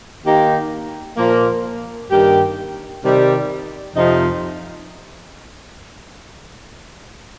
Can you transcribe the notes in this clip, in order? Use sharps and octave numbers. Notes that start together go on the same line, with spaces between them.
D#3 A#3 D#4 G4
A#2 F3 A#3
G2 D#3 A#3 G4
C3 D#3 G3
F2 C3 F3 D#4